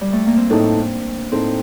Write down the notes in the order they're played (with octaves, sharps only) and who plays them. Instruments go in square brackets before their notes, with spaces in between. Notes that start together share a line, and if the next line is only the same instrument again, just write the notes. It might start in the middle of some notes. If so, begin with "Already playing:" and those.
[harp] G3
A3
A#3
C4
[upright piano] A2 A3 D#4 [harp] D4
[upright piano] A2 A3 D#4 [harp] C4